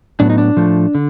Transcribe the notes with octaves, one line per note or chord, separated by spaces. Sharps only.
A2 F#3 B3 D4
D#4
D4
A2 F3 A3
D3